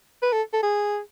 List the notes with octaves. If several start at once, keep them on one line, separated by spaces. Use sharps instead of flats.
B4
A4
A4
G#4